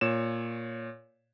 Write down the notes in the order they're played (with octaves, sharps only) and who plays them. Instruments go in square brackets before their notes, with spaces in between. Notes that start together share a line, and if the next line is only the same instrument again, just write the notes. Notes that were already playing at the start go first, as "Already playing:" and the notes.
[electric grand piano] A#2 C#5 E7